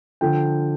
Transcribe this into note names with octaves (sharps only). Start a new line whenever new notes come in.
D3 F3 G5